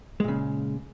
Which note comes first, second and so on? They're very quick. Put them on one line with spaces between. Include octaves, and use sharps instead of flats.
G#3 A#2 C#3